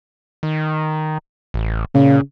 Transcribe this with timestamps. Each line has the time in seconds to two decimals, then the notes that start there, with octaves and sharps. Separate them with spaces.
0.43 D#3
1.54 A1
1.95 A#2 C#3